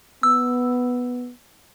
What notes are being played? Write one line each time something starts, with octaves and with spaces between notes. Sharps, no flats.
B3 E6